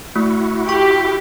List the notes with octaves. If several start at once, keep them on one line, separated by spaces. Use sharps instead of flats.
A3 E4 F#4
G4 C#6